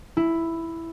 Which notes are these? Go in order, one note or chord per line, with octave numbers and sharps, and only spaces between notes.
E4